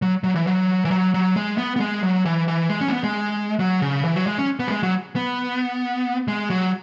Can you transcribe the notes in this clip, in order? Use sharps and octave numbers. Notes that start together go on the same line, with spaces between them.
F#3
F#3
E3
F#3
E3
F#3
F#3
G#3
B3
B3
G#3
F#3
E3
E3
G#3
C#4
G#3
B3
G#3
F#3
C#3
E3
F#3
G#3
C#4
B3
F#3
G#3
F#3
B3
G#3
F#3